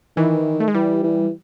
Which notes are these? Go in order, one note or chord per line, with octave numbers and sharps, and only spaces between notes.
D#3 E3
A3
G#3
E3 G3
E3